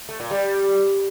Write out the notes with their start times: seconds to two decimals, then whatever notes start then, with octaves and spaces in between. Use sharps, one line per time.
0.09 A3
0.20 A#2
0.31 G3